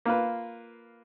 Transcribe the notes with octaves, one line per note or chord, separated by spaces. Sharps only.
A#3 F4 B4